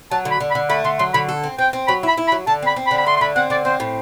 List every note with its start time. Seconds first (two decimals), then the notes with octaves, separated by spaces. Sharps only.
0.11 F#3 A5
0.25 D3
0.31 B5
0.40 D3
0.51 B5
0.55 D3
0.70 A3 B5
0.84 D3 C6
0.99 F#3 C6
1.14 D3 B5
1.29 A4
1.44 C4
1.59 C4 G5
1.73 C4
1.88 F#3 B5
2.03 E4 B5
2.18 E4
2.27 B5
2.32 F#3
2.47 D3 A5
2.62 C4 B5
2.76 C4
2.87 B5
2.91 D3
2.98 B5
3.06 A3 C6
3.16 C6
3.21 D3 B5
3.36 C4 F#5
3.50 D3 D5
3.65 C4 C5
3.80 A2